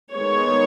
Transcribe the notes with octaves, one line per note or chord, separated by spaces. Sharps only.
D#3 G#3 B3 C#5